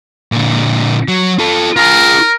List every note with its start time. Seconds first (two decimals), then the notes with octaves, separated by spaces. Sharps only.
0.32 A#2 D3
1.08 F#3
1.39 F4 A4
1.76 F4 G#4 A#4